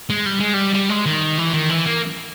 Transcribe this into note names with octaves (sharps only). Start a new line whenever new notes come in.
G#3
G3
G#3
G3
G3
G#3
D#3
E3
D#3
E3
A#3